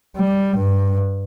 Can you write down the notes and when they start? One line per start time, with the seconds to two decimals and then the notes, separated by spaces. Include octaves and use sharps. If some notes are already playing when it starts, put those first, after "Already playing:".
0.17 G3
0.57 G2